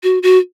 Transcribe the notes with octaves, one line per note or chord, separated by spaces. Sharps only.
F#4
F#4